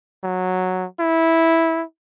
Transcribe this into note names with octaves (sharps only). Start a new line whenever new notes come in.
F#3
E4